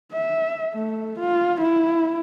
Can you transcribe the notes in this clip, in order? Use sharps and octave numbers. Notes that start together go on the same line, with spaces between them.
E5
A3
F4
E4